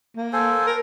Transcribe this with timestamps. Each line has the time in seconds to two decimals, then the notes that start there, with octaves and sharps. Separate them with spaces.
0.17 A#3
0.33 A4 C5 G#5
0.66 A#4